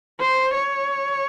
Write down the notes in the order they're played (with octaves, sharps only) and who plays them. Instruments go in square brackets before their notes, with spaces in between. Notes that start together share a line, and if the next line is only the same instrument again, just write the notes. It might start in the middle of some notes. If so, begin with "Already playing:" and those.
[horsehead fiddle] C5
C#5